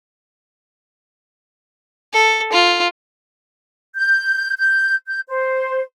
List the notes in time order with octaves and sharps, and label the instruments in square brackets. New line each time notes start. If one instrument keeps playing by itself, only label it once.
[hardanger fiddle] A4
F4
[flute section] G6
G6
G6
C5